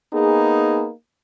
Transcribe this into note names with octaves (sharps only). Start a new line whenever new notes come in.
A#3 B3 D#4 G#4